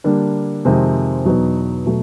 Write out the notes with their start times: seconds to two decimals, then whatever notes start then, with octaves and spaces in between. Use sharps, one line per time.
0.04 D3 G3 A#3 D4
0.65 F2 C3 D#3 G#3 C4
1.25 E2 B2 F#3 B3 D#4
1.86 B2 F#3 A3